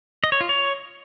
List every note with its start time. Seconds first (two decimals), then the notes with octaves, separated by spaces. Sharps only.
0.24 D#5
0.32 C#5
0.41 F4
0.49 C#5